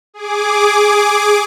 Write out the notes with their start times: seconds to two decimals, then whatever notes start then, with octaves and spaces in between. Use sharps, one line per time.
0.14 G#4 D6